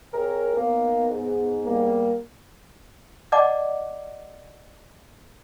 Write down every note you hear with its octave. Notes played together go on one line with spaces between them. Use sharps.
C3 G#4 A#4 C#5
D#2 A#3 B3
G#2
G3 A#3
D5 D#5 F#5 A5 D6